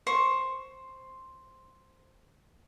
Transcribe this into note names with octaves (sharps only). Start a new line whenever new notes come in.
C5 C#6